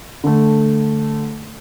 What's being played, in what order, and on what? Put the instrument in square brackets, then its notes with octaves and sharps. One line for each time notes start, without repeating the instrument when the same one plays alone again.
[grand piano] D3 A3